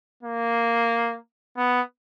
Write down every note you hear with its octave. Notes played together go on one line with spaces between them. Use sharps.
A#3
B3